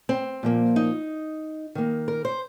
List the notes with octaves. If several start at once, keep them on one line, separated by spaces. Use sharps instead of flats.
C4
A#2 F3 A#3
D#4
D#3 A#3
A#4
C5